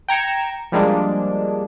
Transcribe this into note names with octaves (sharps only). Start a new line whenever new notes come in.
G5 A#5 G#6 C#7 E7
F3 G3 G#3 A#3 D4